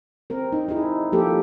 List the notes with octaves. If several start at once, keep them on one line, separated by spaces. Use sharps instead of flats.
C4 A#4
D#4
D#4 E4 G#4
F3 A#3 G4 A4